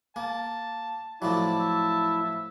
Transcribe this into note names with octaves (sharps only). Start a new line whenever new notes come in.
A#3 A5
A2 F3 F#3 E4 D5 A5
E5